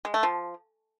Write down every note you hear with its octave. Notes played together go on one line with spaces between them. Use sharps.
G#3
A3
F3